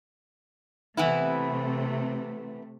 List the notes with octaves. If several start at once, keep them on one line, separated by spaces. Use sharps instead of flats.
C3 E3 A3 B3 E4